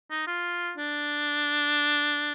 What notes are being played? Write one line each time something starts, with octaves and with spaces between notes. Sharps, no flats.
D#4
F4
D4